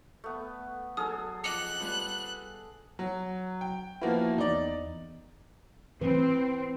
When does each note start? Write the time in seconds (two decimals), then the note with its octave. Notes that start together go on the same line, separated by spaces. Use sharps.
0.24 A3 B3
0.97 F#3 G#4 A4 G#5 D#6 F6
1.44 F3 D#5 D6 F#6 C#7
1.80 G3 B3 F4
2.99 F#3
3.61 G5
4.02 F3 A#3 B3 E4 F#4 A#4
4.38 E2 D#4 D5
6.01 E3 C4 B4